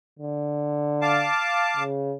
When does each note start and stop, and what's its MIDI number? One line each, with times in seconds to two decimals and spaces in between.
0.19 1.28 50
1.02 1.83 77
1.02 1.83 81
1.02 1.83 86
1.77 2.15 49